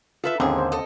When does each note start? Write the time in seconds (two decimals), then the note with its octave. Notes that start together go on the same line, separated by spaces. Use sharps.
0.24 F4 A4 B4 E5
0.40 D#2 G#2 D3 C4 C#4 G#4
0.58 C5
0.72 A4 D#5